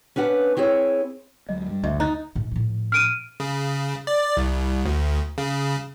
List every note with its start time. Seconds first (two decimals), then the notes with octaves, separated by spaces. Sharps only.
0.16 C#4 D4 B4 F#5
0.57 C4 E4 G#4 C#5
1.49 D2 F#3 G#3 D#5
1.68 G2 G3
1.84 F#1 D2 D#5 E5
2.00 D#4 A#5 F#6 A6
2.36 G#2
2.51 A2 F3
2.92 F6 D7 D#7
3.40 C#3
4.07 D5
4.37 C2
4.85 D2
5.38 C#3